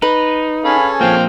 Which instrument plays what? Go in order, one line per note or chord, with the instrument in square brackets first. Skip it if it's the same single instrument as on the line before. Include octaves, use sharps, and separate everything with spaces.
[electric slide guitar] D#4 [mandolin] B4
[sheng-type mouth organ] C#4 G#4 A4 [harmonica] F5 B5
[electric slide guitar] F3 A#3 [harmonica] C4 F4 G5